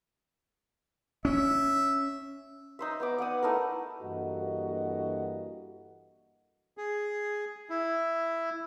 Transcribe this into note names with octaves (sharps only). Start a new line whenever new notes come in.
C#4 E5
D#4 C5 E5
B3 B4 D6
D5 F#5 G#5 D#6
A3 D#4 E4 A#4
G2 E3 A#3 F#4 A4 D#5
G#4
E4